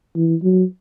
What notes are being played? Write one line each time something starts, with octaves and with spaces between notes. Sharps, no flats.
E3
F#3